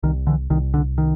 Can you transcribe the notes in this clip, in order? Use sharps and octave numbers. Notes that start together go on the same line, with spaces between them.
C2 D#3
D3 E3
C2 D#3
D3
D#3